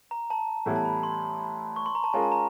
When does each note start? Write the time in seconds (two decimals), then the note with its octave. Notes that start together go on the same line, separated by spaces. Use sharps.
0.11 A#5
0.30 A5
0.66 A2 E3 G3 B3 E4
0.76 A5
0.85 B5
1.03 C6
1.76 C#6
1.86 C6
1.95 A#5
2.04 A5
2.13 G#3 C#4 F4 A#4 G#5
2.22 A5
2.32 A#5